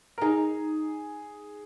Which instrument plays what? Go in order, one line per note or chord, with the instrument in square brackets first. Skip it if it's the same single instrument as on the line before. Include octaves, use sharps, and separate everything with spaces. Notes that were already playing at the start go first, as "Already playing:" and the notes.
[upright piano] A#4
[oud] D#4 [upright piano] G#4